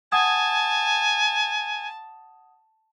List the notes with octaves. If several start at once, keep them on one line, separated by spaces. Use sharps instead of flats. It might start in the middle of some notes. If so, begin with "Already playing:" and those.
F#5 G#5 A5 D#6 G#6